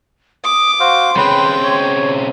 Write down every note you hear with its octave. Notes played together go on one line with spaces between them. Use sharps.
D6 D#6
F#4 C5 F5 C6
C#3 C4 B4 G5 B5
C#5